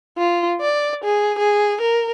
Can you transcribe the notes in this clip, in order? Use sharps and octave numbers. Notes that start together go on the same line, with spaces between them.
F4
D5
G#4
G#4
A#4